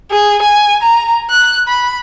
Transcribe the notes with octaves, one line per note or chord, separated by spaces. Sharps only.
G#4
G#5
A#5
F#6
B5